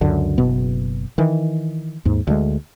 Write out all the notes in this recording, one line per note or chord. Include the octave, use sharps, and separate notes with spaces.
C#2 F#2 D3
F#1 B2 B3
D#3 E3
D#2 G#2
D2 G#3